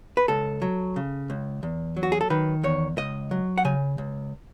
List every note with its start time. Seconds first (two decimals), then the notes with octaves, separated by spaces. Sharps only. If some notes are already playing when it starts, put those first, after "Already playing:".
0.17 B4
0.28 C#2 A4
0.62 F#3
0.96 C#3
1.30 C#2
1.63 E2
1.97 F#3
2.03 F#4
2.12 G#4
2.21 A4
2.30 D#3 B4
2.63 E2 C#5
2.97 C#2 D#5
3.31 F#3
3.58 F#5
3.65 C#3 G#5
3.98 C#2